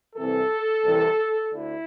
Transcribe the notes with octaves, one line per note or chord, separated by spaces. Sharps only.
C2 C3 E3 A4
C2 C3 E3
D2 D3 E4